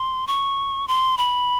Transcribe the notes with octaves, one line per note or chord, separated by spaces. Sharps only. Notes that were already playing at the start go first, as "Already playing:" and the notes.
Already playing: C6
C#6
C6
B5